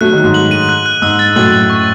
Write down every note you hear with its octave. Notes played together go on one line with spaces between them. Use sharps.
F#3 A3 F#6
D#3 F#3
F#6
G#2
F#7
D#7
F#6
F#6
G#2 E6
A6
F#2 A2 F#7
F#7
C#6